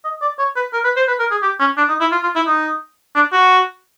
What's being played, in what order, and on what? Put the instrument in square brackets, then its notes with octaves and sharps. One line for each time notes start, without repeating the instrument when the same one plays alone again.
[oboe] D#5
D5
C#5
B4
A#4
B4
C5
B4
A#4
G#4
G4
C#4
D4
D#4
E4
F4
F4
E4
D#4
D4
F#4